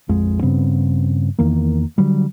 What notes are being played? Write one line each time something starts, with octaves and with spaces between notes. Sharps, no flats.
A#1 F2 G#3
G2 C#3 B3 C4
E2 D#3 A#3
D3 F#3 G3